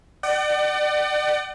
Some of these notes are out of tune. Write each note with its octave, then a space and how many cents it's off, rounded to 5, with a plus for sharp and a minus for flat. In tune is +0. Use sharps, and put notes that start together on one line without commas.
D5 +30 F#5 +45